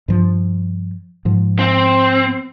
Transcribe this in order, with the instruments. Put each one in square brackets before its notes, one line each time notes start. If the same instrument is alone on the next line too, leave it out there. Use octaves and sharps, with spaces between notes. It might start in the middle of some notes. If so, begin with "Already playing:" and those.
[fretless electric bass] G2 F3
G#2 F3
[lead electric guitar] C4